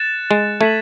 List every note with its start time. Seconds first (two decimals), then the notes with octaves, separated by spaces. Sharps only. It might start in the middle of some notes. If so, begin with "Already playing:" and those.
Already playing: F#6 A6 C#7 E7
0.31 G#3
0.61 A3 G#6 B6 D#7 F#7